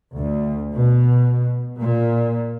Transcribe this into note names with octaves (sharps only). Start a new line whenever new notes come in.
D2
B2
A#2